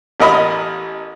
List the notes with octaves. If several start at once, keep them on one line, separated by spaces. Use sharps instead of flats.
A1 A#4 D#5 B5 D#6 F6